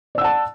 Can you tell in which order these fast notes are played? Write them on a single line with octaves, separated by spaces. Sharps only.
D5 E6 F#5 A5